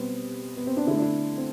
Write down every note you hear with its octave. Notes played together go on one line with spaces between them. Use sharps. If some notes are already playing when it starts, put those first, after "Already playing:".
Already playing: B2 G3 B3 C4
B3
C4
D4
D3 A3 E4
D4
E4
C4